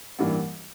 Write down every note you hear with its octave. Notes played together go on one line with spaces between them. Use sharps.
A1 G2 E3 G3 A#3